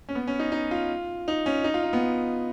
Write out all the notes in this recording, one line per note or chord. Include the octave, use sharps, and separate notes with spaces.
C#4
B3
C#4
D#4
D#4
F4
D#4
C#4
D#4
F4
D#4
B3